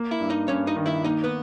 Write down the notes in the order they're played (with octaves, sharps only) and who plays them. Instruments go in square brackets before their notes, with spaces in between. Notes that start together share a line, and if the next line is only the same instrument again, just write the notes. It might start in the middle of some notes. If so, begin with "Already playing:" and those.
Already playing: [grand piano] A#3
[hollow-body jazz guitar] E4 E5
[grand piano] G2
[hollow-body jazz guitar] D#4 D#5
[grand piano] G2 [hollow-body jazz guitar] C#4 C#5
[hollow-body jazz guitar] D#4 D#5
[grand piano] D#3
[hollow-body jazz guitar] E4 E5
[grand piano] A#3 [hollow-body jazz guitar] D#4 D#5
[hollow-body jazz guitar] B3 B4